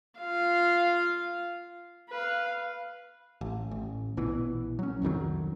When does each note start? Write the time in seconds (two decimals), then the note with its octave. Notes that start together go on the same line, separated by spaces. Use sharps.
0.20 F4 F5
2.10 B4 F5
3.41 A1
3.71 A1
4.17 A#1 B2 E3
4.79 F#3 C#4
5.02 C2 F2 D#3 F#3